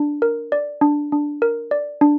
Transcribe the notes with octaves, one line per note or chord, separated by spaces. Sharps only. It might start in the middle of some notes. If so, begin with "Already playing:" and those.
Already playing: D4
A#4
D5
D4
D4
A#4
D5
D4